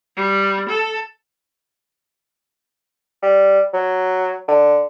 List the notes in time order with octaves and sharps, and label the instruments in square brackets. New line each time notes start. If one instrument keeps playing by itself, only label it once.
[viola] G3
A4
[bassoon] G3
F#3
D3